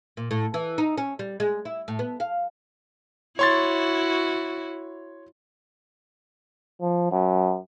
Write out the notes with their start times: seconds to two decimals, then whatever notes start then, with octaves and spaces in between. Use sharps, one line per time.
0.17 A#2
0.31 A2
0.54 E3
0.78 D#4
0.98 C#4
1.19 G3
1.40 G#3
1.65 E4
1.88 A2
1.99 B3
2.20 F5
3.39 E4 F#4 C#5 C6 A6
6.81 F3
7.12 F#2